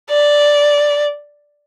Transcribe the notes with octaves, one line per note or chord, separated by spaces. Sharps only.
D5